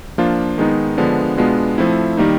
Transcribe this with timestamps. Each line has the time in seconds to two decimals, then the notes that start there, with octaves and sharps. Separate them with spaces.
0.18 F3 A#3 D4 F4
0.58 D#3 G#3 B3 D#4
0.97 D3 F3 G#3 B3 D4
1.37 B2 G#3 B3 D4 F4
1.78 F3 A3 C4 E4
2.17 D#3 G3 A#3 D#4